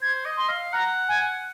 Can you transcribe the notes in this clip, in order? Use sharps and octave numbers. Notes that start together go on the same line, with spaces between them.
C5 G#6
D#5
C6
F5
F#5 A#5
G#5